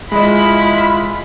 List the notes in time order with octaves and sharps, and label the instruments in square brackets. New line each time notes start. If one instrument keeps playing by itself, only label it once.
[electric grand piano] G#3 D#5 [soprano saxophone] E4 [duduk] F4 [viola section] B5